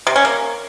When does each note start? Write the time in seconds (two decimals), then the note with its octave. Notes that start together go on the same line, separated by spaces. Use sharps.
0.07 C3
0.16 C#4
0.25 A#3